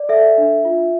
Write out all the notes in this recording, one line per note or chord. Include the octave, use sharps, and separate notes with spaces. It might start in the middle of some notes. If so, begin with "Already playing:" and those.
Already playing: D5
A4 E5
D4
F4